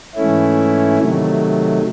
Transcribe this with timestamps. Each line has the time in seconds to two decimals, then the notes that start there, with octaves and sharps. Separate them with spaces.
0.15 G#2 E3 A3 C#4 E4
0.98 C3 D#3 F#3 A3